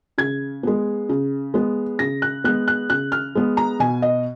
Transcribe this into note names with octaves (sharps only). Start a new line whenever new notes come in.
C#3 G#6
G#3 B3
C#3
G#3 B3
C#3 A#6
F#6
G#3 B3 F#6
F#6
C#3 F#6
F6
G#3 B3
A#5
B2 G#5
D#5